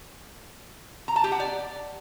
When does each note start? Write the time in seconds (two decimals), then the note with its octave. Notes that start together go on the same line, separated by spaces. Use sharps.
1.08 A#5
1.16 A5
1.24 G4
1.32 F#5
1.40 D5